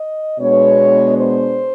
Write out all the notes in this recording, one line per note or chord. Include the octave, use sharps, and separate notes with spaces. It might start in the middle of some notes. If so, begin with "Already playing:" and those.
Already playing: D#5
B2 G#3 B3 D4 C#5
C5